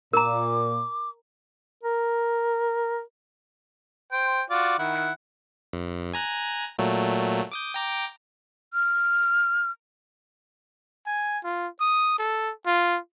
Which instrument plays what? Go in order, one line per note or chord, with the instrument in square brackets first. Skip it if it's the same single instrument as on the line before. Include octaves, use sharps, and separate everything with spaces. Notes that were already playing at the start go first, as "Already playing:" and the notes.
[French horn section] A#2 [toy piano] A#4 A#5 [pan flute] D6
[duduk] A#4
[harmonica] C5 G5
F4 F#4 D5
D#3 E4 F#5
[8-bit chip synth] F2
G#5 A#5 F#6
A#2 F#3 A3
D6 D#6 G6
G5 A#5 D6
[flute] F6
[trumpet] G#5
F4
D#6
A4
F4